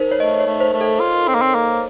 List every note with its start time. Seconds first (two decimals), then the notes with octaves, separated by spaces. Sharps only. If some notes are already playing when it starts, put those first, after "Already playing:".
Already playing: D#4 A#4 C5
0.11 C#5
0.20 A3 D#5
0.40 C#5
0.46 A3
0.60 C5
0.74 A3
0.81 A4
1.00 F4
1.28 C4
1.35 A#3
1.42 C4
1.55 A#3